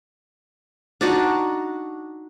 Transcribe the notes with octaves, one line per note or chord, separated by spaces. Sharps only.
D4 D#4 F#4